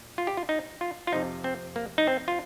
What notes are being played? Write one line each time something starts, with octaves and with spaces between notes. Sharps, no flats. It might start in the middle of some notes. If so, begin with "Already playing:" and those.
Already playing: A#2
F4
G4
F4
D#4
F4
F4
F2 C3 F3 D#4
C4
A#3
D#4
C4
F4